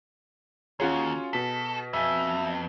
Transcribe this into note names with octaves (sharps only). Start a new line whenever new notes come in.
D#2 C#4 F4 F#4 G#4 C#5
B2 A4 B6
F2 E5 G#5